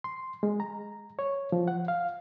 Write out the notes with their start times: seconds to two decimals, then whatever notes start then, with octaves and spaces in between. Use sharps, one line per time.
0.04 C6
0.43 G#3
0.60 A#5
1.19 C#5
1.52 F3
1.68 F#5
1.88 F5